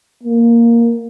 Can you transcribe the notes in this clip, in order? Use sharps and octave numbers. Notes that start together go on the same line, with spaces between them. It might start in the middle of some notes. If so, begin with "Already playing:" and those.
A#3